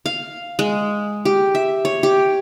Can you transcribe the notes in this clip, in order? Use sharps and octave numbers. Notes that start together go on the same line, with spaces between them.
F5
G#3
G4
E5
C#5
G4